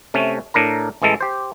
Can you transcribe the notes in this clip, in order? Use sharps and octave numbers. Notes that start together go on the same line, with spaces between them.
C3 A3 C#4
A2 D4 A#4 A#5
A1 E3 G#3 A4
G4 C5